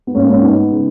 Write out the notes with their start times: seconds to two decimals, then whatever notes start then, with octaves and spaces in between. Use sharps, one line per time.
0.07 B3
0.14 G#1 G#2 G3 A#3 C#4
0.28 A#3 C#4
0.42 B3 D#4
0.71 C#3 G#3